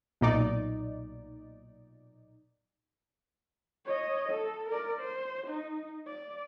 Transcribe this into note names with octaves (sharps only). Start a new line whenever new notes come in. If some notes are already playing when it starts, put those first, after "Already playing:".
B1 A#2 D#4 D5
C#5 D#5
A4
A#4 D5
C5
D#4
D5